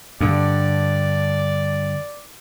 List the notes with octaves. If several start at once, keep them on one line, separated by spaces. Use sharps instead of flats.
G2 D3 D5